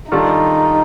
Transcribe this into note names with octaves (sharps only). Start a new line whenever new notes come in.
D#3 G3 D4 D#4 F4 A4